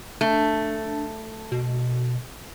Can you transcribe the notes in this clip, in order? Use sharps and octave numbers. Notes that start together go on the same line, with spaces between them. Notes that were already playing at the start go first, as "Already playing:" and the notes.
A3 D4
B2